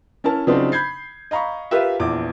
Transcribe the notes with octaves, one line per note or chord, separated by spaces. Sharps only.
C#4 E4 A#4 A5
C#3 F3 F#3 C4 D4 D#4
B5 G6 G#6 C7
D#5 F5 A#5 B5 C#6
F4 G4 A#4 B4 E5
A#1 E2 D6